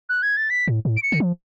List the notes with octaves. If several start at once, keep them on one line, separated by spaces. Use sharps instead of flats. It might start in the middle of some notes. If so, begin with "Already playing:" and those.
F#6
G#6
A6
B6
A2
A2
D7
C#7
D3
F3